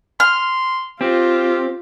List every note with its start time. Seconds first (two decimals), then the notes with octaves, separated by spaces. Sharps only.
0.20 C6 F6
1.01 C4 F4 G4